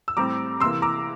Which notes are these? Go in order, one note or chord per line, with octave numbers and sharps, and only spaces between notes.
E6
A2 G3 C4 A#5 D6
C3 E3 A#3 C6 E6
A#5 D6